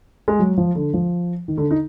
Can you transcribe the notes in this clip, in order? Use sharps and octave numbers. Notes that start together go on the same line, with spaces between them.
G#3
F#3
F3
D3
F3
D#3
D3
D#4